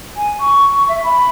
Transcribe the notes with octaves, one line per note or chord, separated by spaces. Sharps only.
G#5
C#6
E5
B5